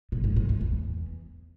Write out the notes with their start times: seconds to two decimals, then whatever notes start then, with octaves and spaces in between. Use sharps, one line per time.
0.12 B2
0.24 G#2
0.36 G#2
0.49 F#2
0.61 E2